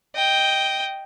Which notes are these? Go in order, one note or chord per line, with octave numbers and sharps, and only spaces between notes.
D#5 G5